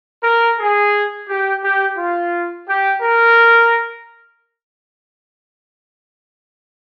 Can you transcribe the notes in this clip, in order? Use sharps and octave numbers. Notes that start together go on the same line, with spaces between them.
A#4
G#4
G4
G4
F4
G4
A#4